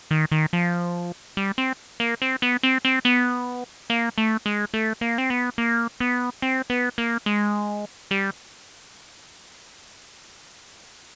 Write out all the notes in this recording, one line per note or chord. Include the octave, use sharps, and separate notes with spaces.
D#3
D#3
F3
G3
C4
A#3
C4
B3
C4
C4
B3
A#3
A3
G#3
A3
A#3
C4
B3
A#3
B3
C4
B3
A#3
G#3
G3